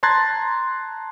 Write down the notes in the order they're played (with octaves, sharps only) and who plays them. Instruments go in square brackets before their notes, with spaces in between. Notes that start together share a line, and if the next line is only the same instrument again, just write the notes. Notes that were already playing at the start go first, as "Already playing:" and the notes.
[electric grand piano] A5 A#5 C6 F#6 G#6 A6